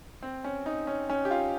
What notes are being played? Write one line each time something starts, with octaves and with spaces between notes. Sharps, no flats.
C4
C#4
D#4
C#4
C#4
G4
F4